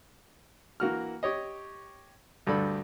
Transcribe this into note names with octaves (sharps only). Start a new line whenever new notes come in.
E3 A#3 F#4 F6
G4 C#5 D#5
D2 G2 D4 A4 B5